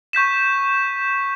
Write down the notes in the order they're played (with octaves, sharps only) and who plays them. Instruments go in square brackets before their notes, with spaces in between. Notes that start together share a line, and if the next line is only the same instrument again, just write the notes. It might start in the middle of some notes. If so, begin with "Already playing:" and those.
[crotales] C#6 G6 B6 E7